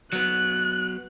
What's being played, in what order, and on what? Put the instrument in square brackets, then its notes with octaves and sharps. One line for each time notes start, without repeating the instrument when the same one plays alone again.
[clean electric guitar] F#3 B3 [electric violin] F#6